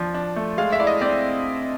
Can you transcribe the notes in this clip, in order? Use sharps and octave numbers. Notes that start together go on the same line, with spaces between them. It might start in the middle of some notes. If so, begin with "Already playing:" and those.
Already playing: F3 D4
D4
A3
G#3 F5
E5
E4 D5
D#5
C4 D5